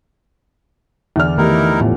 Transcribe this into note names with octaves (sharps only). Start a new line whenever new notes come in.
E2 D3 D5 F6
D#3 A3 B3 D#4 E4 G4 A#4
A2 F3 B3 F4